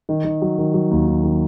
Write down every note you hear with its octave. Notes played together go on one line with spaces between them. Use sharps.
D#3
D#3
F#3
D#3
F#3
D#2
D#3
D#3